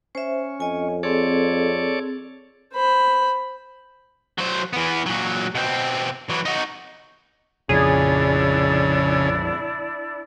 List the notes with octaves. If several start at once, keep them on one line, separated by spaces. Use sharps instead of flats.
C#4 C5 E5
F2 C#5 D#5 G#5
C4 G#4 A4 C#5 D5
C5 B5
F#3 C5
E3 B3
A#2 F#3
B2 C4
E3 F#3
D#4 F#4
A#1 F2 C#3 F3 D4 E4 G#4 D5